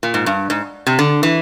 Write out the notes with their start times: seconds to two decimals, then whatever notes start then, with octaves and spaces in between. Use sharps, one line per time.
0.03 A#2
0.14 G#2
0.26 G2
0.50 G#2
0.87 C3
0.99 D3
1.23 E3